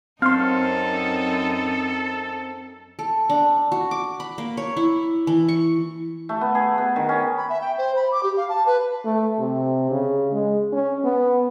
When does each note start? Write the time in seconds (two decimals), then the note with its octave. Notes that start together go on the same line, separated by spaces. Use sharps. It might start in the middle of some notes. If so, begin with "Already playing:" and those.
0.22 F#2 C4 D#4 A4 F5 C6
2.99 A4
3.30 D4
3.72 F#4
3.91 D6
4.20 B5
4.38 A#3
4.57 C#5
4.77 E4
5.27 E3
5.49 C#6
6.29 A3
6.41 B3
6.55 G#4
6.78 B3
6.96 D#3
7.09 C#4
7.37 B5
7.49 E5
7.61 G5
7.78 C5
7.96 B5
8.12 D6
8.23 G4
8.37 F5
8.49 A5
8.66 B4
9.05 A3
9.39 C3
9.91 C#3
10.32 G#3
10.72 C#4
11.04 B3